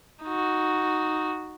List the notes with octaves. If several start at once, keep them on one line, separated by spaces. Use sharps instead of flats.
D#4 F#4